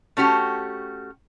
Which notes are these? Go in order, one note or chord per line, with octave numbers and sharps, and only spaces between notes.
A3 C#4 F#4 G4